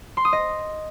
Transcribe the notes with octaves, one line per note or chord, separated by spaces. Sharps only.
C6
D#6
D#5